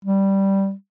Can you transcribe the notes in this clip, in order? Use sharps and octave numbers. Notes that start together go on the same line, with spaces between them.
G3